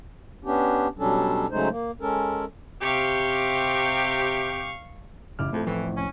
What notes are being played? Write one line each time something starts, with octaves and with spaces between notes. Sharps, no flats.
B3 C#4 D4 G4
B2 F#3 G3 C#4 D4 A4
C#3 F#3 G#3 A3 D#4 C5
A#3
G#3 C#4 A4 A#4
C3 G4 F5 C#6
A1 F#2 C#3 E4 D6 F6
F2 A3 A4
F2 A2 E3
C2 C#4